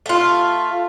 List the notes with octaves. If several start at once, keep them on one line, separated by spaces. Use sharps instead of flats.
A3 F4